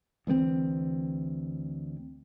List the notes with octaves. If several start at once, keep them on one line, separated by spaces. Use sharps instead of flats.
D2 E3 G#3 C4